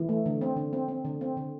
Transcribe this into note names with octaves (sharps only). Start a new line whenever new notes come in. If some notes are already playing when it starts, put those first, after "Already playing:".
Already playing: E3
A3
D3
C4
D3
C4
C4
D3
C4
D3